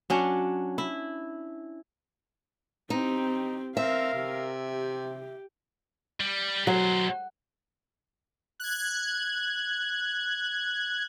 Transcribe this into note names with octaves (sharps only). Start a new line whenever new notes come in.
F#3 C#4 D4
E4
C4 D#4 G4
C4 A#4 E5 F5
C3
G4
G3
B2 F#3 C5
F#6 G#6